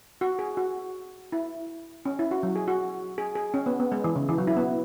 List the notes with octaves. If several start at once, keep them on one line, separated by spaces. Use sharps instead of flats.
F#4
G#4
F#4
E4
C#4
E4
F#4
F#3
G#4
F#4
G#4
G#4
C#4
B3
B3
G#3
E3
C#3
E3
F#3
E4
B3